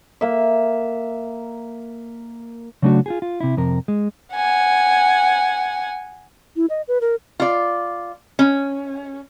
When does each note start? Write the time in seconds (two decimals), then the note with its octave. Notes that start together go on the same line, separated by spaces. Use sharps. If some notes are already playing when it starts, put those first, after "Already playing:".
0.21 A#3 E5
2.82 C#3 F#3 A3 D4 F4 F#4
3.06 F4 G4 G#4
3.22 F4
3.40 C3 E4
3.57 F2 C3 A#4
3.88 G#3
4.36 F#5 G#5
6.56 E4
6.70 D#5
6.88 B4
7.01 A#4
7.40 F4 D5
8.39 C#4